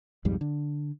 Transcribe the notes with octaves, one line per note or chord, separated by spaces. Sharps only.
B1 F2 G#2 G3
D3